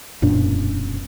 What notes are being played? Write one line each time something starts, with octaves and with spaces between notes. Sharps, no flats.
E1 F#2 A#2 D4